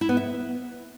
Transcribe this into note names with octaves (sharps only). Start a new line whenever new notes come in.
E4
B3
E5